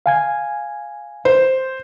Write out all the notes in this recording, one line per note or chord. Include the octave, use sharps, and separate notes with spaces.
F5 G#5 G#6
C5